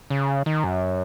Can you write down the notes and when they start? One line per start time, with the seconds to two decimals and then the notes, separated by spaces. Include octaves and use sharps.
0.10 C#3
0.46 D#3
0.64 F#2